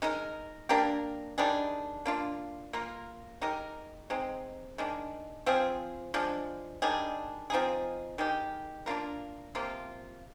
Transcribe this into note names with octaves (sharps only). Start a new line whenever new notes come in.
G#3 D#4 A#4
A#3 D4 G4 A#4
D#3 G3 D4 G#4
A#3 D4 F4
A#3 F4 A#4
G#3 D#4 G4 A#4
G#3 C4 D#4
D#3 G#3 D4
F3 C4 F4 G#4
F3 G#3 D4
D#3 G3 D4 G#4
F3 C4 D#4 G#4
D#3 G#3 D#4 G4
A#3 D4 F4 A#4
C3 F3 A#3 F4